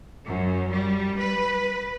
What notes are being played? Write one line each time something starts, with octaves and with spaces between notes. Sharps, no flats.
F#2
G3
B4